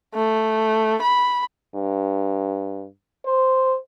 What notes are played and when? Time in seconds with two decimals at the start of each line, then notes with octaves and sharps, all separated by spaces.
0.14 A3
1.02 B5
1.75 G2
3.26 C5